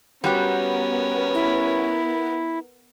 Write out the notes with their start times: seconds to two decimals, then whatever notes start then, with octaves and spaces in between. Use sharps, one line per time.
0.24 G3 B3 C#4 F#4 G4 A#4
1.34 E4